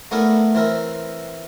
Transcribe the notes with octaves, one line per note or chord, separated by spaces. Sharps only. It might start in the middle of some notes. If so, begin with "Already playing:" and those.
A3 B3 D4 E4 A#4 B4
E3 C4 A#4 E5